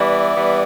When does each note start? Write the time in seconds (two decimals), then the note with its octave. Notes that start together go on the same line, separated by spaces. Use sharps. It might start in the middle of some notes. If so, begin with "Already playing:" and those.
Already playing: E3 G3 B3 D5 E5
0.35 E3 G3 B3